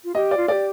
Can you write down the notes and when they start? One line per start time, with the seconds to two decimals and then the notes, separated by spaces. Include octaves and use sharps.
0.04 F4
0.15 G4 D#5
0.31 D5
0.37 F4
0.48 A4 D5
0.52 G4